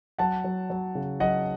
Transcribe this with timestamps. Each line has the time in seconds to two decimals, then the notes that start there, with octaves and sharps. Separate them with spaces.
0.18 F#3 F#5 A5
0.44 F#3
0.70 F#3
0.95 C#3
1.20 F#3 D#5 F#5